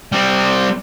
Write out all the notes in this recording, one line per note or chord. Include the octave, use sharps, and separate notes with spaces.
G3 C4